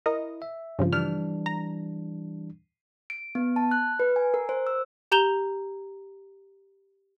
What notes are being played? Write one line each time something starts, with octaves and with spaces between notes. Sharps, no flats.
E4 A#4 D#5
E5
G2 C#3 F3
E3 G3 D4 F6
A#5
D7
B3
A5
F#6
B4
G#5
A#4
C5
E6
G4 A#5 G6 E7 F7 G7